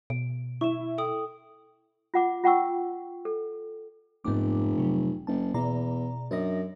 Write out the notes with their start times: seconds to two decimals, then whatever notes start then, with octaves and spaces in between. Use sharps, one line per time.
0.10 B2 D7
0.61 E4 C#6 E7
0.98 A4 G5 D#6
2.14 F4 F#5 D6
2.44 F4 F#5 G5 C#6 E6
3.25 A4
4.24 F1 G#2 B3 D6
4.78 C3 F#3
5.27 F#1 A5
5.54 E2 B2 D5 A#5
6.31 F#2 D4 D#5 A#6